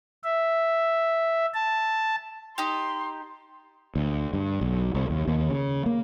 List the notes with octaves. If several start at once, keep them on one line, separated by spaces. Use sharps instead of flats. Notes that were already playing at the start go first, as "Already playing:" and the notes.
E5
A5
D#4 G4 C6
D2
G2
B1
C2
D#2
D#2
C#3
A#3